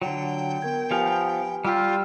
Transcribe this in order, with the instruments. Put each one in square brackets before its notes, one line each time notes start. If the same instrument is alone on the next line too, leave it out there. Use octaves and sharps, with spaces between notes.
[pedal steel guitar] D3 F#3 [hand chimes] F4 [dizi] G5
[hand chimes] B3 A#4 G#6
[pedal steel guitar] F3 B3 F5 [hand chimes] G4 B4 G#5
[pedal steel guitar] G3 G4 [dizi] F4 [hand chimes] G5 E6 F6